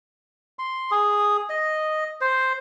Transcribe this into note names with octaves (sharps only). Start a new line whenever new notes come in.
C6
G#4
D#5
C5